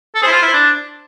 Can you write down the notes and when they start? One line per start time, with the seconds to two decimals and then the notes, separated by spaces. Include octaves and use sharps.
0.15 A4
0.22 G#4 C5
0.27 E4
0.32 F4
0.43 E4
0.54 D4